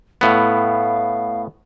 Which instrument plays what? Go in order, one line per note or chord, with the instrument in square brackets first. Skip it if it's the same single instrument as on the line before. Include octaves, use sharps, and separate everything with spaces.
[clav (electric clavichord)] A2 B3 [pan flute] F5